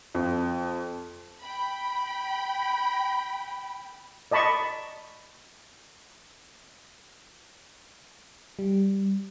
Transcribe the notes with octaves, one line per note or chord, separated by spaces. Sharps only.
F2
G5 B5
D5 D#5 A5 B5 C#6
G3